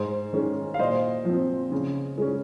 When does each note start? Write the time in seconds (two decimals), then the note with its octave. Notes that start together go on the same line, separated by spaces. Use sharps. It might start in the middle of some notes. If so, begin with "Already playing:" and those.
Already playing: G#2 G#4 C5
0.33 D#3 G#3 C#4
0.74 F5
0.79 A#2 C5 D#5
1.25 F3 C4
1.72 C#3
2.18 G#3 C#4